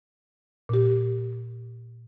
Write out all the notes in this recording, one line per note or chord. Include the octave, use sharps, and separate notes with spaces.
A#2 G4